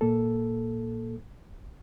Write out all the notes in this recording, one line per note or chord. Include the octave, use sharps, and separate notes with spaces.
A#2 A#3 A4